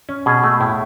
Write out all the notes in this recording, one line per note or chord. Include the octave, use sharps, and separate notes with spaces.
C#4
B2 G#4
A3 G#4
A2 E4